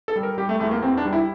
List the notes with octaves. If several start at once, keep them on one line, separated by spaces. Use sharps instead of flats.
A4
G3
A#4
G3 G4
A3
E2 A3
A#3
E2 C4
D4
G3
E4